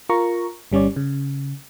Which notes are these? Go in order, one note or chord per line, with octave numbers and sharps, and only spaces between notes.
F4 A#4 A#5 C#6
G1 G3 C#4 C#5 D5
C#3